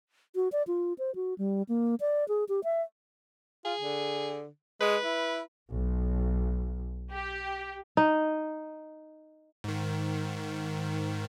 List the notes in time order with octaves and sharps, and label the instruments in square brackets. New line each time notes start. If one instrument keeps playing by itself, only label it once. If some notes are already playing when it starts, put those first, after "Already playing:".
[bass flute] F#4
D5
F4
C5
F#4
G3
A#3
D5
G#4
G4
E5
[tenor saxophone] F4 [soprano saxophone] G#4
[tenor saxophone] D3
[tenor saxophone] G#3 [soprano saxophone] B4
[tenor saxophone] E4
[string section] B1
G4
[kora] D#4
[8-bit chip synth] G#2 D#3